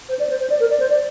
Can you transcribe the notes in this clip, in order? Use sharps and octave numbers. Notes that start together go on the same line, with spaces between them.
C5
D5
C5
C5
D5
A#4
D5
C5
D5